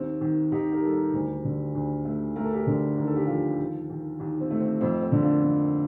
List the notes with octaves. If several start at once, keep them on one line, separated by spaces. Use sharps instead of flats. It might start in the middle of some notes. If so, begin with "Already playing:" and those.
Already playing: D#2 C4
D#3
D#2 D#4 G4
G4 A#4
G3 A4
G4 A#4
D2
D3
D2
A3
A3 A#4
A4
G4 A#4
D3
D#2 A#4
A4
G4
F3 F4 A4
D#2
D#3
D#2
C4
A3
C4
F2 C4
C4
D3
A#3 D4
F2 C4